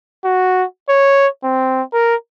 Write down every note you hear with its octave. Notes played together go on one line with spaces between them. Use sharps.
F#4
C#5
C4
A#4